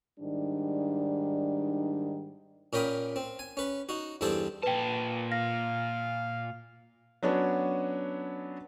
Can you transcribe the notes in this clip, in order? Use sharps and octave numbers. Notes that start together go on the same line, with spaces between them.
G#2 D#3 G3 D4
A#2 C#4 A#4 G5 B5 D#6
C4
G#5
C#4 B4
D#4 F#4
E2 G2 C4 G#4 A4 G5
A#2 B4 G5 A5
F5 A#6
F#3 B3 C#4 D4